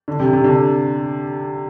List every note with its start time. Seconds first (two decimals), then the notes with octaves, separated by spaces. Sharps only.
0.08 D3
0.20 C3
0.33 C3
0.44 D3